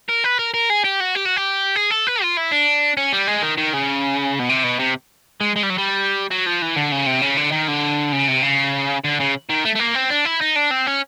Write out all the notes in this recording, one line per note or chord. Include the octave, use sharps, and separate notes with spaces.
A#4
B4
A#4
A#4
G#4
G4
F#4
G4
F#4
G4
G#4
A4
B4
F4
E4
D4
C#4
G3
G#3
D#3
D#3
C#3
B2
C3
B2
C3
G#3
G#3
G3
F#3
G3
F#3
F3
E3
D3
C#3
C3
C#3
D3
D#3
D3
C#3
C3
C#3
D3
C#3
D#3
A3
A3
A#3
C4
D4
E4
D#4
D4
C4
C#4